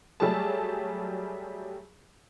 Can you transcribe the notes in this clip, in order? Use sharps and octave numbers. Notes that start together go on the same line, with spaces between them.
F#3 G3 A3 G4 G#4 A5